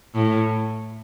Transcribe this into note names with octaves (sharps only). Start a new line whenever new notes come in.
A2